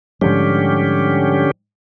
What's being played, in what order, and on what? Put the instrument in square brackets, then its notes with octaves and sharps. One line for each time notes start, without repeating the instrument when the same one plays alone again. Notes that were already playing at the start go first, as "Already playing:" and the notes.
[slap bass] G#2 F3 G3 [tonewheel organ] D3 C#4 G4